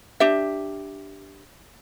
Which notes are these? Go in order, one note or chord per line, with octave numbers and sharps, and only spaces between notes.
D4 G4 E5